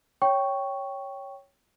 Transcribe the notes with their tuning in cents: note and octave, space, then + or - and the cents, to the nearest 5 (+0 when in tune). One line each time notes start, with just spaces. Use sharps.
C#5 +0 G5 -5 C#6 +0